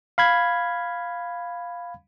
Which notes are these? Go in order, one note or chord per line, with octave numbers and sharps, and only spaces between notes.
F5 B5 G#6